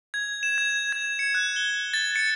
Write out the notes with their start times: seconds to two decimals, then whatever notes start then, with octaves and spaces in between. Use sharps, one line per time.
0.14 G#6
0.43 E7
0.58 G#6
0.93 G#6
1.19 C#7
1.35 F#6
1.56 G7
1.94 A6
2.16 C#7